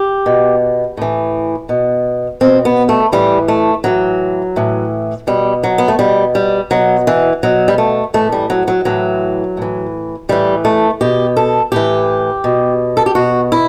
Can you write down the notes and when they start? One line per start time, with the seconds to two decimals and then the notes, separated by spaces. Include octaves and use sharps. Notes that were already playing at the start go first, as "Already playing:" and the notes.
Already playing: G4
0.26 B2
0.97 A2 E3
1.69 B2
2.41 B2 C4
2.65 B3
2.89 A3
3.12 A2 E3 G3
3.48 A3
3.84 A2 E3 F#3
4.56 A2 E3
5.27 B2 G3
5.64 F#3
5.78 B3
5.88 A3
5.99 B2 G3
6.35 G3
6.71 B2 F#3
7.07 E3
7.43 B2 F#3
7.68 G3
7.78 A3
8.14 A2 E3 A3
8.32 G3
8.50 F#3
8.68 F#3
8.85 A2 E3 F#3
9.57 A2 E3
10.29 A2 E3 G3
10.65 A3
11.01 B2 G4
11.37 A4
11.72 A2 E3 G4
12.44 B2
12.97 A4
13.06 G4
13.15 B2 F#4
13.52 E4